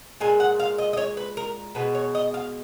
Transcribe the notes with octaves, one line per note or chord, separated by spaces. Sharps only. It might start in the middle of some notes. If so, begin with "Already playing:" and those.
A#2 G#3 G#5
F#5
F5
D#5
D#5
C#5
B4
A#4
B2 G#3 B4
C#5
D#5
F5